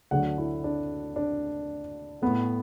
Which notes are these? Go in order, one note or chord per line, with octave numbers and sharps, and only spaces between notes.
D2 D3 F#3 A3 F#5
E4
D4
D4
A2 A3 B3